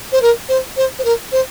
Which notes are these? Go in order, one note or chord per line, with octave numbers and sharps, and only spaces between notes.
C5
A#4
C5
C5
C5
A#4
C5